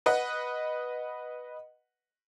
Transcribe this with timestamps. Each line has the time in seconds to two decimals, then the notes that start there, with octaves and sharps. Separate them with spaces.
0.06 B4 D#5 F#5